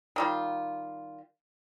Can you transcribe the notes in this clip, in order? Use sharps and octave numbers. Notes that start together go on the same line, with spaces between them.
D#3 G3 F4